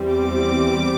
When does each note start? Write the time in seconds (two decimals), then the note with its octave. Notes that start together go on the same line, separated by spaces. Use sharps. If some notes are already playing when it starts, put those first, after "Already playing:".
Already playing: E2 E3 G3 C4
0.14 D6